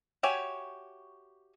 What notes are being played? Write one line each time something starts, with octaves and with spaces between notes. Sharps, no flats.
F#4 G4 C#5 E5 G#5